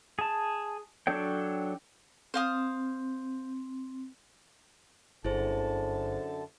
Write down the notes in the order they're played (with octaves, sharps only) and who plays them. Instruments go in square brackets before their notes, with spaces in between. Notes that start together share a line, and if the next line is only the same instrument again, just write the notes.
[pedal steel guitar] G#4 A5
F#3 D4 A4 C#5 G5
[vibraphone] C4 [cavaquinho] C5 F5 D#6
[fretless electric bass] G1 [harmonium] F#2 D3 A5 [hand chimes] E4 G#4 C5